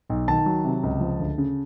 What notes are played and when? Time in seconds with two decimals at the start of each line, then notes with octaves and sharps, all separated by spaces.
0.10 B1
0.28 D#3 A5
0.46 F#3
0.65 C3
0.83 C#2
1.01 F3
1.20 D2
1.38 C#3